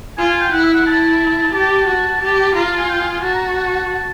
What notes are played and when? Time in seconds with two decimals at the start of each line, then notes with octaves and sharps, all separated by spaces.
0.18 F4 G#5
0.30 G#5
0.41 G5
0.52 E4 F#5
0.63 E5
0.74 F#5
0.86 E4 A5
1.53 G4 A5
1.87 F#4
2.21 G4 A5
2.55 F4 A#5
2.67 A5
2.78 G#5
2.89 G5
3.01 G#5
3.11 G#5
3.23 F#4 A5
3.34 A#5
3.46 A5
3.56 A5